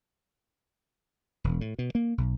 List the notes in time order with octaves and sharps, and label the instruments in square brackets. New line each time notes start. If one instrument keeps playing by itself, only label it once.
[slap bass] E1
A2
B2
A#3
B1